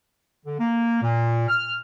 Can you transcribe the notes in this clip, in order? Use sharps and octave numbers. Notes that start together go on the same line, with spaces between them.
D3
A#3
A#2
F6